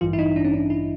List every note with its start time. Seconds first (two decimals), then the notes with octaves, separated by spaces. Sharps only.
0.01 A1 G2 E3 F4
0.13 E4
0.19 D#4
0.36 D4
0.45 C#4
0.54 D4
0.70 E4